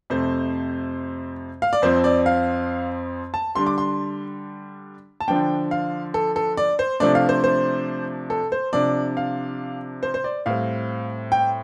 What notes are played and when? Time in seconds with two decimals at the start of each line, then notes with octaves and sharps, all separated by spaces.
0.10 F2 C3 A3 C5
1.62 F5
1.73 D5
1.82 F2 F3 C4 C5
2.04 D5
2.26 F5
3.34 A5
3.55 D3 G3 D4 C6
3.67 D6
3.78 C6
5.20 A5
5.28 D3 F3 D4 G5
5.71 F5
6.14 A4
6.36 A4
6.57 D5
6.79 C5
7.00 C3 F3 A3 D4 D5
7.15 F5
7.29 C5
7.44 C5
8.30 A4
8.52 C5
8.73 C3 F3 D4 D5
9.17 F5
10.03 C5
10.14 C5
10.24 D5
10.46 A2 G3 C4 F5
11.32 G5